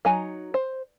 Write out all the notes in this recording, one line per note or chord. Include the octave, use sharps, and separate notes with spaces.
F#3 D#4 G#5 A#5
C5